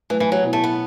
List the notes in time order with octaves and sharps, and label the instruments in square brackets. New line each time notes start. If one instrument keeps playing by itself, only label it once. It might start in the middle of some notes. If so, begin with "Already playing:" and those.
[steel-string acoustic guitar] E3 [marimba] F#3 A3 E4 B4
[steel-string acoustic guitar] E3
F#3
[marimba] B2 B3 E4
[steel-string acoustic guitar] A3
B3